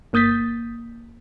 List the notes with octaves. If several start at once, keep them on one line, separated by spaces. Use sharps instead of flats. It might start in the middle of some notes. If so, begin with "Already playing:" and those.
G1 A#3 D#6 G6 A6 B6